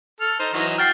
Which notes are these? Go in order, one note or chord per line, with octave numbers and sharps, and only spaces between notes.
A4 F6
D#4 C5
E3 F#3 D#4
F#4 G5 F6 A6 C7